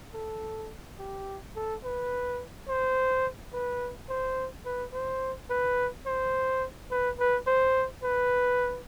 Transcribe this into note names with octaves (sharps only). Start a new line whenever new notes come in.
A4
G4
A4
B4
C5
B4
C5
B4
C5
B4
C5
B4
B4
C5
B4